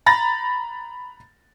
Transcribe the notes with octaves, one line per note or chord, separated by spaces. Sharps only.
A#5 B5 A6 A#6